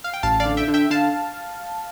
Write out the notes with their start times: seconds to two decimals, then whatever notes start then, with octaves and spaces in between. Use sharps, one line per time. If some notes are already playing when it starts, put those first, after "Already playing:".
0.04 F5
0.13 G5
0.23 A1 F5 A5
0.40 D5 F5
0.46 D3
0.57 E5 G5
0.68 D3
0.74 E5 G5
0.90 D3 F5 A5